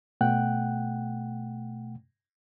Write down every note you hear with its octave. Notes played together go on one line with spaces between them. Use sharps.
B2 A3 F#5 G5 F#6